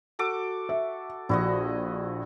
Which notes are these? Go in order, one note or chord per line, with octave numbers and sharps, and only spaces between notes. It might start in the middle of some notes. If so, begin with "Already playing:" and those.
F#4 A4 D6
E5
A#1 E4 F#4 D#5